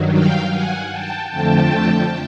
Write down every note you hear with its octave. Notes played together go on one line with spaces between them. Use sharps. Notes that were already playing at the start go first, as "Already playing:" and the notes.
Already playing: G2 D#3 F#3
F5 G5
F#5 G#5
G5 A5
F2 D3 F3 A3 G5 A5